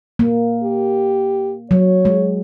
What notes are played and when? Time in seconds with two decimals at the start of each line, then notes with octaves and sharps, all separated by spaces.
0.19 A#3
0.63 G4
1.71 F#3 C#5
2.05 G#3